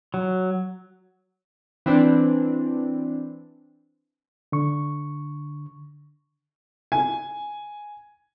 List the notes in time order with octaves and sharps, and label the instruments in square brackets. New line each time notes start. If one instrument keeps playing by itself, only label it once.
[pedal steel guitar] F#3
[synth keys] E3 C4 D4
[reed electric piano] D3 C#6
[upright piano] G#5